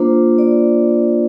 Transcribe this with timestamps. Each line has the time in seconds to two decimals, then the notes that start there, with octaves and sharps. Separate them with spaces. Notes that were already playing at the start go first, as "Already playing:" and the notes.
Already playing: A#3 D4 F4 C5
0.38 D5